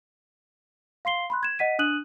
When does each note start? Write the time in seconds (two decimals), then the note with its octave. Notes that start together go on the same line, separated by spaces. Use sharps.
1.05 F5 C6 C7 G7
1.30 B5 C6 F#6
1.43 G#6 E7
1.59 D#5 F#5 B6 D#7
1.79 D4 D#6 F#6 D#7 F#7